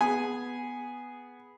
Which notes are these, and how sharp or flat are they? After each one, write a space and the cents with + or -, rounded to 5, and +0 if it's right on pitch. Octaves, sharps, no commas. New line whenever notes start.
B3 +0 G#4 +0 G#5 +0